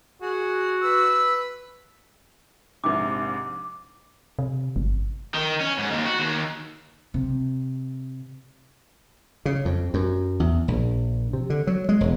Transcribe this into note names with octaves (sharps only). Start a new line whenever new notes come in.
F#4 G#4
B4 E6
A#1 G#2 C3 D6
C3
G1
D#3
C#4
G#2
D#2
F#4
D#2
C3
C#3
F2
F#2
E2
A#1
C3
D3
F#3
G#3
E1